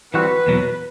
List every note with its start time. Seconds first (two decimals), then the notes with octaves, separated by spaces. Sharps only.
0.14 E3 G3 C4 F#4 B4
0.47 E2 B2 F#3